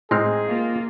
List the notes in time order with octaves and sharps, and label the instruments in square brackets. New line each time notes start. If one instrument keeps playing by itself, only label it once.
[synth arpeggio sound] A2 F6 [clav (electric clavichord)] G#3 C4 D#4 [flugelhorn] G#4
[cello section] A#3 F4